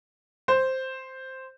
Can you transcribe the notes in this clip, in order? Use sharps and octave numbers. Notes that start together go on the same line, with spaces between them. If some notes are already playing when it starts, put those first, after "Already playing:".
C5